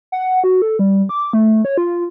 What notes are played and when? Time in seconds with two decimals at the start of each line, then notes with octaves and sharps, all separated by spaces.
0.12 F#5
0.44 F#4
0.62 A4
0.79 G3
1.09 D6
1.33 A3
1.65 C#5
1.78 F4